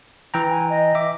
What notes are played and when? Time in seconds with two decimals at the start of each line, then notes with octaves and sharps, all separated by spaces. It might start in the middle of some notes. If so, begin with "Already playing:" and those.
0.34 E3 G5 A#5
0.49 G#5
0.70 D#5
0.95 E5 D6